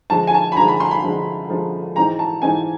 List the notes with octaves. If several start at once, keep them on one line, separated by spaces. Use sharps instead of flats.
D3 F3 G#3 A5
G#5
A5
B5
D3 F3 G#3 A#5
B5
C6
B5
D3 F3 G#3
D3 F3 G#3
G#2 E3 G#3 C4 D#4 A#5
A5
G#2 E3 G#3 C4 D#4 G#5